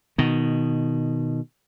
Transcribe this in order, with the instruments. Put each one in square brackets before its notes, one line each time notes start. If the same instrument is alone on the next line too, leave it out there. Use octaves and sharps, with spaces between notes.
[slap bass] B2 D#3